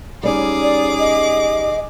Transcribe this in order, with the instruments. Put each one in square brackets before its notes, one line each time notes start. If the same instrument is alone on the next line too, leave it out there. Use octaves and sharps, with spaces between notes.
[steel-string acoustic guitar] G3 C#4 D#4 [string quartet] G#4 D6
[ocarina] D5
D#5